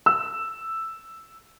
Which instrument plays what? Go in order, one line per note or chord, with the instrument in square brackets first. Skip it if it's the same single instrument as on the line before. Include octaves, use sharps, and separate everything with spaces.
[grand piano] E6